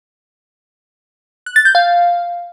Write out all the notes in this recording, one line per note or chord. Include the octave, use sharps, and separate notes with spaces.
F#6
A6
G6
F5